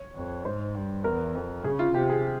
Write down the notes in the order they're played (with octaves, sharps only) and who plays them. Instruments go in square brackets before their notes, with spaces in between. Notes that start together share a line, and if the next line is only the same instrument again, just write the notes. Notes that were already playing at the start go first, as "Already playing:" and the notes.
Already playing: [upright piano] C#5
[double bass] F2
[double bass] G#2 [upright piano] C5
[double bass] G2
[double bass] E2 [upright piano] A#4
[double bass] F2
[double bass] C#3 [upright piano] G#4
[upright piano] F4
[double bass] C3 [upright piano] G4
[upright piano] G#4